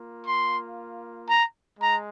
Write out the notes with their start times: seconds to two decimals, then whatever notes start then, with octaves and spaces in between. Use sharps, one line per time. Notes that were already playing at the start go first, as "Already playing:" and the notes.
Already playing: A#3 F4
0.24 C6
1.28 A#5
1.79 G#3 A#5